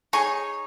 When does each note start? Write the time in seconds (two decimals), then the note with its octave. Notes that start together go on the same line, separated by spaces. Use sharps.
0.13 D#4 G#4 C#5 G#5 C#6